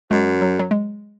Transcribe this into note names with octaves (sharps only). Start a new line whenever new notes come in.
F#2 G#3
F#3
F#3
G#3